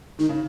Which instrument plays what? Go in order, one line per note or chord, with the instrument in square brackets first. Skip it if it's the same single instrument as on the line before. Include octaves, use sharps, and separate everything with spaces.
[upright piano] D#3 [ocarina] D#4
[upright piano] C#3